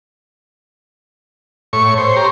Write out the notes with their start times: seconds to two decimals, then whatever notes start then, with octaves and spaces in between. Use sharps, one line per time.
1.73 A2 C#5 C#6
1.98 C5 C#5
2.16 G4 A#5 C6